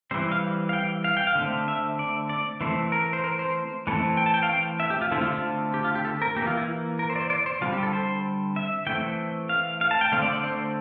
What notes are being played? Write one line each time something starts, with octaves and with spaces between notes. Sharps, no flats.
E3 G3 C4 C5
F5
F5
G5
F5
G5
F5
D3 A3 C4
E5
D5
D5
E3 A3 C4 C5
A#4
C5
A#4
C5
E3 A3 C4
G5
A5
G5
F5
G5
E5
G4
F4
D3 A3 C4 E4
F4
F4
G4
F4
G4
A4
A#4
A#3 G4
E3
F4
E4
A#4
C5
D5
C5
D5
C5
D3 G3 C4 F4
G4
A4
C5
E5
E3 A3 C4 G5
F5
F5
A5
G5
D3 A3 C4 F5
D5
D5
C5